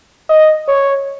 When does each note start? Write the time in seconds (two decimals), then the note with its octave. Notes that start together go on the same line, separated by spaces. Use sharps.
0.29 D#5
0.68 C#5